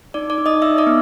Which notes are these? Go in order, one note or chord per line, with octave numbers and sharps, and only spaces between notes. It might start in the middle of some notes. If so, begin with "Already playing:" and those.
D#4 D5 D6
D5 D6
D#4
D#5 D#6
D#4 E5 E6
D5 D6
B3